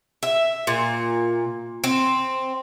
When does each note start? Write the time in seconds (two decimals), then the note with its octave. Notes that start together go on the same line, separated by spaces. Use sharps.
0.23 E5
0.67 A#2
1.84 C4